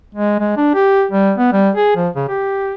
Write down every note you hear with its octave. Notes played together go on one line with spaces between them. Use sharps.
G#3
G#3
D4
G4
G3
B3
G3
G#4
F3
C#3
G4